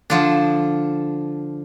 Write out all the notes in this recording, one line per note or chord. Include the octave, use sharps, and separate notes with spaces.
D3 F3 D4